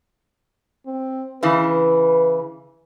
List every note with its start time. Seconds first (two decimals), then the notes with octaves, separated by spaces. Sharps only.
0.86 C4
1.43 C#3 E3 B4